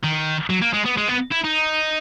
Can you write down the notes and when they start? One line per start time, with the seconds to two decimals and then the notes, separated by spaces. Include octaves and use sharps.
0.03 D#3
0.50 F#3
0.62 A#3
0.74 G#3
0.86 B3
0.98 G#3
1.09 B3
1.32 E4
1.45 D#4